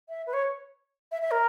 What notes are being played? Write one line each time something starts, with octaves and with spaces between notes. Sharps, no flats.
E5
B4
C#5
E5
E5
A#4